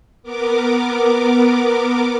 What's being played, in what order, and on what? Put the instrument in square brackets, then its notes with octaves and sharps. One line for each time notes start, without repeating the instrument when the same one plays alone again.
[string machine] B3 A#4 D6